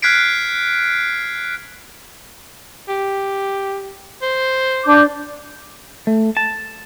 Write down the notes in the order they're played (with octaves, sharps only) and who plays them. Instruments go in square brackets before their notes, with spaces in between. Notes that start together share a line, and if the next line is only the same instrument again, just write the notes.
[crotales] F6 F#6 G#6 B6 C7 D7
[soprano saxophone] G4
C5
[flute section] D4 D6 G6
[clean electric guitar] A3
A5